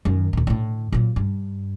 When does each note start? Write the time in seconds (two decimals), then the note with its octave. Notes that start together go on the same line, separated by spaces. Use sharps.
0.05 F#2 D#3
0.33 D#2 A#2
0.47 A2 D3
0.92 A#2 F#3
1.16 G2